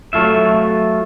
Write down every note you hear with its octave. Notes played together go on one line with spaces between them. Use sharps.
F#3 A3 F4 E5